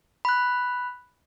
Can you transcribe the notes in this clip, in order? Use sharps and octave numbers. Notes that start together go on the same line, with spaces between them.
B5 F#6